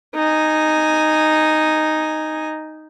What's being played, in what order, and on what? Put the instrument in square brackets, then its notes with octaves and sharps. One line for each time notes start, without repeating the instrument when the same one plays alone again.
[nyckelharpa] D#4 G#5